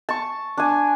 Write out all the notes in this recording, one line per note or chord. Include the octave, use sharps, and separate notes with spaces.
A5 C#6
D4 G#5